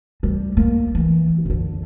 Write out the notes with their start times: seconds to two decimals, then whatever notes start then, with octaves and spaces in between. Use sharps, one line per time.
0.23 G3
0.57 A#3
0.95 E3
1.45 F#2 D3